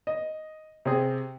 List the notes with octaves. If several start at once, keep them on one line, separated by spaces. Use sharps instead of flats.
D#5
C3 C4 G#4